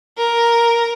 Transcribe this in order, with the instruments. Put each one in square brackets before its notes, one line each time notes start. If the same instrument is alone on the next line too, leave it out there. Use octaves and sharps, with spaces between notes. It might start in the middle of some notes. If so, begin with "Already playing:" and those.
[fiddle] A#4